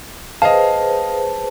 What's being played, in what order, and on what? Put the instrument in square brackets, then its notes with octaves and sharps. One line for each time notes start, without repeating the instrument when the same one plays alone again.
[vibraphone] G#4 B4 C5 [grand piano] D#5 F5 [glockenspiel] A5